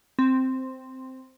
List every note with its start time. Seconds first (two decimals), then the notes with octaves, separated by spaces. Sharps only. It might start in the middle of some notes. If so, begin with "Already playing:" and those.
0.19 C4